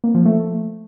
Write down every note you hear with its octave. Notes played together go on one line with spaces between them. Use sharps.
A#3
F3
A3